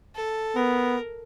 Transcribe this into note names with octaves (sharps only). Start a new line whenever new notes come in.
A4
B3 A#4